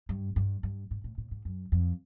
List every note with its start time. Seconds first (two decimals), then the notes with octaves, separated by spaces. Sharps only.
0.09 G2
0.36 G2
0.63 G2
0.91 G#2
1.04 A2
1.18 A2
1.31 G#2
1.45 F#2
1.72 F2